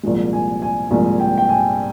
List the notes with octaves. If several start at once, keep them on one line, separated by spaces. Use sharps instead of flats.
C2 A#2 F3 G#3
G#5
G#5
C2 A#2 F3 G#3 G#5
G5
G5
G#5